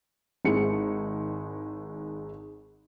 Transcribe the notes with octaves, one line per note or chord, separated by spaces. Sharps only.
G#1 G#3 E4 C#7